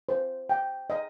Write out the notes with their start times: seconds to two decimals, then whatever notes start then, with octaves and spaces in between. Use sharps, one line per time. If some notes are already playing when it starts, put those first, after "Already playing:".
0.09 C5
0.49 G5
0.90 D#5